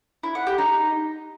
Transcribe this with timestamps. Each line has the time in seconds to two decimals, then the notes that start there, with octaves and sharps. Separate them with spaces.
0.23 E4
0.35 F#5
0.47 G4
0.58 D#4